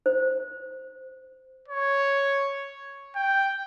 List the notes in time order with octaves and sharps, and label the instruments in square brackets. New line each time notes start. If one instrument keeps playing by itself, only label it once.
[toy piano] C5
[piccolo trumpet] C#5
G5